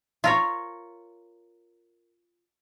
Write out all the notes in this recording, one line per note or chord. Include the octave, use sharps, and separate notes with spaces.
F4 A#4 C#5